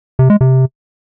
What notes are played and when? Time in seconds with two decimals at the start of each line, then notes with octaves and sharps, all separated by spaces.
0.19 C3
0.30 G#3
0.41 C3